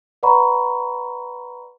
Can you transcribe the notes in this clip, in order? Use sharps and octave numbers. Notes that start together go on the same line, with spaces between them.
B4 D5 F#5 A#5 B5 C#6